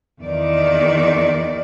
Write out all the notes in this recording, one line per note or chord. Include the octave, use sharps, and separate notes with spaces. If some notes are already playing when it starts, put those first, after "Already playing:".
E2 D#3 D5